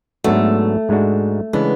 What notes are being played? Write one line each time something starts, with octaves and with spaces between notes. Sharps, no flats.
G#2 F#3 A3 B3 D4 F#4
G#2 G#3 D4 F#4
C#3 E3 G#3 B3 D4